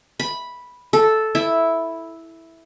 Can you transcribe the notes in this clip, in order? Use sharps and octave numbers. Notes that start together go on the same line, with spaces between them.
B5
A4
E4